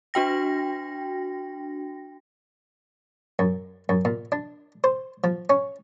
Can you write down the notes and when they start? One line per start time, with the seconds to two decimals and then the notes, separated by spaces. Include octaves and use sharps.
0.14 D4 F#4 G5 A#6
3.39 F#2
3.89 F#2
4.05 A#2
4.32 D4
4.84 C5
5.24 F3
5.50 C#4